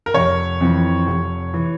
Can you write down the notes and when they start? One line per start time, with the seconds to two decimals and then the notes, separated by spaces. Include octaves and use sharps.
0.06 A#4
0.14 F1 C#5
0.61 F2 E3
1.07 F1
1.54 E3